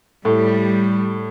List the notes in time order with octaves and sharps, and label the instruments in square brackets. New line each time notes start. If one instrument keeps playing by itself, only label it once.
[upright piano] A2 [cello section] G3